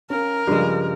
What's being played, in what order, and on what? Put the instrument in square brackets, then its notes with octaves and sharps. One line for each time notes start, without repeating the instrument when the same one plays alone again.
[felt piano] C#4 F5 [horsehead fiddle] A#4
[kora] G2 G#3 [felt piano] C#3 F3 G4